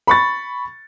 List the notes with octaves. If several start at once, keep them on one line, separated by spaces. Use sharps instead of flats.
B5 C#6 A6